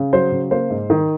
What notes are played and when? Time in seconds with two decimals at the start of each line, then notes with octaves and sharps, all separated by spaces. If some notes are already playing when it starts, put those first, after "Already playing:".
Already playing: C#3
0.13 F#3 C5
0.32 C#3
0.51 A#3 C5
0.70 G#2
0.90 D#3